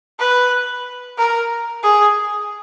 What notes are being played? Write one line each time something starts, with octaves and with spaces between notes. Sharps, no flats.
B4
A#4
G#4